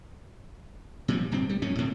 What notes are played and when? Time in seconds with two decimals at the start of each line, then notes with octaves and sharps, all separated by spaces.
1.08 A#2 F3 G3
1.32 D1 G2 B2 C4
1.49 G3
1.62 A#1 F#2 A#2 C#4
1.78 D#2 A2 D3 C4